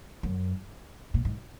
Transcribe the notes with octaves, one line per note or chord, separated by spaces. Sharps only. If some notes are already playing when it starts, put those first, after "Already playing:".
F#2
A#2
G#2